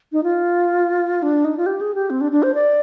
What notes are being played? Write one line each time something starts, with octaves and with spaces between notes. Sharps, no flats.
D#4
F4
D4
D#4
F4
G4
G#4
G4
C4
D4
D4
C5
D5